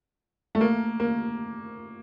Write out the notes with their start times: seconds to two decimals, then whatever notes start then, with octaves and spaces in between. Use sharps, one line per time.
0.55 A3
0.61 A#3
1.00 A#3